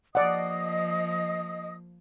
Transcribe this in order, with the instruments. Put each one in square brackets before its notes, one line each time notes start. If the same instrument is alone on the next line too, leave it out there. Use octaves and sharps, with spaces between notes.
[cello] F3 A#3 [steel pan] D5 F#5 [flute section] D#5 D#6